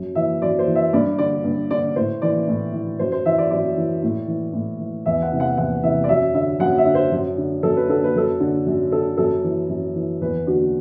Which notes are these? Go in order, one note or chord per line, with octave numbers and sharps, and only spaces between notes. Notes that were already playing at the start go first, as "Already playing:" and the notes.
Already playing: F#2
E3 E5
F#2 D5
C5
E3
E5
G2 D5
D3 D5
G2
D3 D5
A2 C5
E3 D5
A2
E3
F#2 C5
C5
E3 E5
D5
F#2 D5
E3
A2
E3
A2
E3
E2 E5
F#5
C3 E3
F#5
E2 F#5
C3 E3 E5
D5
F#2 E5
D3 E5
F#2 F#5
E5
D3
C5
F#2
D3
F#2 A4
B4
D3 A4
B4
F#2 A4
D3
F#2
D3 A4
F#2 A4
E3
F#2
E3
E2 B4
D3 F#4